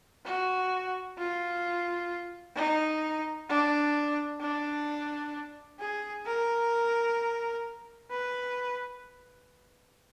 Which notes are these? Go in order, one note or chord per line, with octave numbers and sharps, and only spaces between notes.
F#4
F4
D#4
D4
D4
G#4
A#4
B4